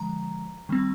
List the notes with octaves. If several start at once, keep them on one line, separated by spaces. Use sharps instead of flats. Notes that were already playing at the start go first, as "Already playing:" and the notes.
Already playing: D3 F3 G#3 A#5
D#3 G3 C4